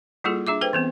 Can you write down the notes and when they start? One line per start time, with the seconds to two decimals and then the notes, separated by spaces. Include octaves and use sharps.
0.24 G3 A#3 E4 F4 G#4 A4
0.47 D4 G#4 E5 D6
0.61 A4 B4 C5 G5
0.73 E3 B3 C4